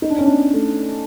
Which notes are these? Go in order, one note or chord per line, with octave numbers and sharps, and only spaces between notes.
D#4
D4
C#4
D4
A3